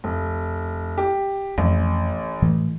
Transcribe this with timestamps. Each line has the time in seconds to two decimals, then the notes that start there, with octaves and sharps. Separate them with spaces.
0.04 F1
0.98 G4
1.58 A1 F2
2.42 A2 E3 A3